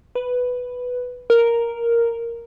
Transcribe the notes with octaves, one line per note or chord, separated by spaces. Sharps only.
B4
A#4